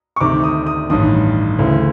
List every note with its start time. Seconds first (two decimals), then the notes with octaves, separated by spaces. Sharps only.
0.16 C#6
0.21 D2 C3 D#3 D6
0.44 D#6
0.67 D#6
0.90 A1 G2 D#3 D#6
1.59 D2 C#3 E3